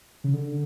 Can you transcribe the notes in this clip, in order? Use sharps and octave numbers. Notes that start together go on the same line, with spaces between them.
C#3
D3